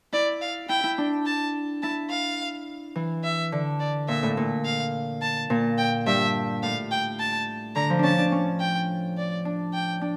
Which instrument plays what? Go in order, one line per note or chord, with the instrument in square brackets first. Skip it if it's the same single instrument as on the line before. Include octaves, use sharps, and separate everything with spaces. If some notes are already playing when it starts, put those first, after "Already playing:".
[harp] E4 [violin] D5
[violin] F5
[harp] E4 [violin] G5
[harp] E4
D4
[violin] A5
[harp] E4 [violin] A5
[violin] F5
[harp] E3
[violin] E5
[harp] D3
[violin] D5
[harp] A#2 [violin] E5
[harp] A2
A#2
[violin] F5
A5
[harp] A#2
[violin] G5
[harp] G2 [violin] E5
[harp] A2 [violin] F5
[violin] G5
A5
[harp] D3 [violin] A#5
[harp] F3
[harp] C#4 D4 [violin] A5
[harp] D4
C#4
[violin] G5
D5
[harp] D4
[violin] G5
[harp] D4